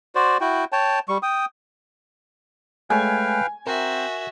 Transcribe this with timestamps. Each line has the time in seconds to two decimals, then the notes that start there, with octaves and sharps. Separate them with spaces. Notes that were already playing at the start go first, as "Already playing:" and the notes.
0.15 F#4 C5 D5
0.41 E4 F#4 G5
0.72 C#5 G5 A5
1.09 G3 C#6
1.23 G5 D#6
2.90 G#3 A3 B4 C#5 F5 G5 G#5
3.67 C4 F#4 A#4 E5